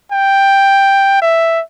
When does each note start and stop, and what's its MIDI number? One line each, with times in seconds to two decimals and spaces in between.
0.12 1.22 79
1.22 1.61 76